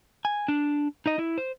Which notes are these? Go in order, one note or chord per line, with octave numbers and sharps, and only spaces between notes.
G#5
D4
D#4 D#5
E4
C5